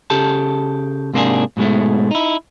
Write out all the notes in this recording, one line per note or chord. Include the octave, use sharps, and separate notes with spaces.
C#3 G4 A4 A5
G#2 C3 A#3 C#4 D4 G#4
G#2 B2 F#3 G#3 A3
D#4 E4